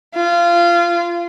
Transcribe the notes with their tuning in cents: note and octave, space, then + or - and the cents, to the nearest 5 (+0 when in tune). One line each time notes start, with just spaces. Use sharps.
F4 -20